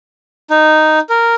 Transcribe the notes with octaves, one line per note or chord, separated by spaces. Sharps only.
D#4
A#4